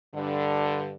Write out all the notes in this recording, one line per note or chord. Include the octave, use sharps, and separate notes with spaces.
G2 D3